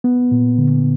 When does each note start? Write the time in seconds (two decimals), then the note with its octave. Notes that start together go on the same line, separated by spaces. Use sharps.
0.04 B3
0.31 A#2
0.58 D3